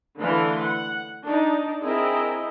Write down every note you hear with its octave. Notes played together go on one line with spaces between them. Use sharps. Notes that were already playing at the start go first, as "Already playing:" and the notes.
D3 E3 A3 B4 F5 C6
F#5
D4 D#4
C4 E4 G#4 A#4 D#5